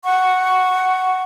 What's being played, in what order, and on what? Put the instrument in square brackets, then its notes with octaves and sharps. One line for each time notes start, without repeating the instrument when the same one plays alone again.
[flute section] F#5 C#6